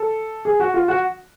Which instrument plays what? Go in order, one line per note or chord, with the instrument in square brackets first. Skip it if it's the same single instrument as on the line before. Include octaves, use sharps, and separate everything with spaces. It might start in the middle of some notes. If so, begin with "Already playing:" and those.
Already playing: [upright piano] A4
G#4
F#4
F4
F#4